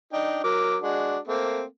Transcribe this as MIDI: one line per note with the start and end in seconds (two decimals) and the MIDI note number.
0.13 0.40 62
0.13 0.40 63
0.13 0.40 79
0.44 0.76 54
0.44 0.76 70
0.44 0.76 86
0.82 1.18 56
0.82 1.18 62
0.82 1.18 66
1.27 1.64 57
1.27 1.64 58
1.27 1.64 60